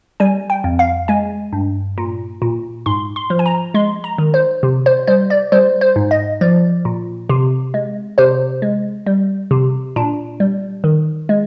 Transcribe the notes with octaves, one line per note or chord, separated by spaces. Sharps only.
G3 G#5
G5
F2
F5
G#3 G#5
G2
A#2
A#2
G#2 C6
C6
F3
G#5
A#5
G#3 C6
A#5
D#3
C5
C3
C5
G3 C5
D5
G3 C5
C5
G#2
D#5
F3 D5
A#2
C3
G#3
C3 C5
G#3
G3
C3
A#2 D4
G3
D#3
G#3